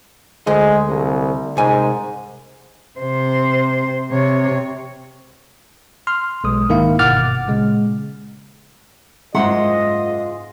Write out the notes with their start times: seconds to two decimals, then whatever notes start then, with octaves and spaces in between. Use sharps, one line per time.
0.47 D2 G#3 D#5
0.88 C2
1.57 C2 G#2 G#5
3.00 C3 C5
4.11 C3 C#5
6.07 C6 F6
6.44 B1 G#3 D#6
6.69 G#2 D#3 A#3 E4 F5
6.99 G1 B2 F#5 D6 F6 A6
7.48 A#2 C#3 G#3
9.35 F#1 G#2 G#3 F4 D#5 E5 F#5 C6